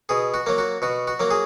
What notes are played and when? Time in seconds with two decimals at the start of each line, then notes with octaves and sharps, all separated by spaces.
0.09 B2 G#4
0.34 F#4
0.46 F#3 A#3
0.58 F#4
0.82 B2 F#4
1.07 F#4
1.20 F#3 A#3
1.31 G#4